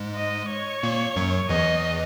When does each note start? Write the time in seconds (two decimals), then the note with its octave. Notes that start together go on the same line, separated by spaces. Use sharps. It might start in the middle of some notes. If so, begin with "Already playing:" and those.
Already playing: G#2 G#3
0.16 D#5
0.50 C#5
0.83 A#2 A#3
1.16 F#2 F#3
1.49 E2 E3 D#5